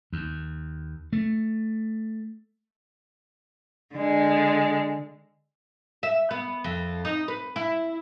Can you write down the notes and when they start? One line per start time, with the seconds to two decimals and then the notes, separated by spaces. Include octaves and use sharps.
0.13 D#2
1.13 A3
3.94 D3 G#3
6.03 E5
6.31 B3
6.64 F2
7.05 D#4
7.28 B4
7.56 E4